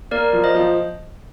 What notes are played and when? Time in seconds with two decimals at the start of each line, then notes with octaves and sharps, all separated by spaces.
0.11 A#3 A#4 D5
0.33 F3
0.43 C5 D#5
0.55 F3